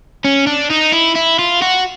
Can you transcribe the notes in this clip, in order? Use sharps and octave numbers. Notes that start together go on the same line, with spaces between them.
C#4
D4
D#4
E4
E4
F4
F#4